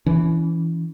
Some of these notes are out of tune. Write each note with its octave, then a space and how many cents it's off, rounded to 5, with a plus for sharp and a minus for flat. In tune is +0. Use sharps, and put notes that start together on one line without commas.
E3 +0 C#4 +30